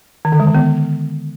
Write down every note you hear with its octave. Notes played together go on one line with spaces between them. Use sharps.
D#3
D3
G#3
D#3
B3